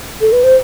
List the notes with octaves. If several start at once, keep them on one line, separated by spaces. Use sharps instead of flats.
A4
B4
C5